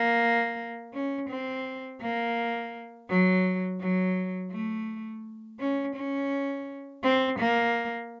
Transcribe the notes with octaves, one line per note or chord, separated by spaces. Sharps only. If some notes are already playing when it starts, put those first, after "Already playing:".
Already playing: A#3
C#4
C4
A#3
F#3
F#3
A3
C#4
C#4
C4
A#3